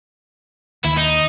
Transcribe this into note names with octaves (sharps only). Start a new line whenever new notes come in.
D#2 E4
D#4